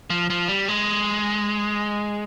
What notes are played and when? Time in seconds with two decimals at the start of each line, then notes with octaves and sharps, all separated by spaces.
0.10 F3
0.30 F3
0.48 G3
0.68 G#3